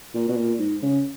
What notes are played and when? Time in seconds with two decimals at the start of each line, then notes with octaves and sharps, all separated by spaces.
0.14 A#2
0.28 B2
0.36 A#2
0.59 G#2
0.82 C#3